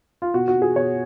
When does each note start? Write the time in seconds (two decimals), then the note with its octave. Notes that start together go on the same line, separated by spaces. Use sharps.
0.22 F4
0.34 B2 F#4
0.48 F#4
0.55 B2
0.62 G#4
0.76 B2 C#5